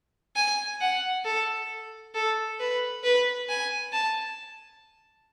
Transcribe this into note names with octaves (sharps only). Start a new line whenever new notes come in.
G#5
F#5
A4
A4
B4
B4
G#5
A5